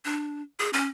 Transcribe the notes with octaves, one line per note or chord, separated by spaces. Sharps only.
D4
G#4
C#4